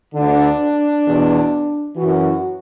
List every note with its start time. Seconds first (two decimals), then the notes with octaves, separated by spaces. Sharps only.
0.14 D2 D3 D4
1.05 E2 B2
1.96 F#2 E3 F#4